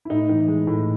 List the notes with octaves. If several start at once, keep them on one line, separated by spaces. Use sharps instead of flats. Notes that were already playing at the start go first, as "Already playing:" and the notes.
E4
A2 D#4
E3 D#4
G#3
A2